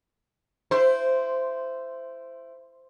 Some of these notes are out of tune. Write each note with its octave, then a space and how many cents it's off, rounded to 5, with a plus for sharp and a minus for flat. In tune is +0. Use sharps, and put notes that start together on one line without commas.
E4 +20 C5 -10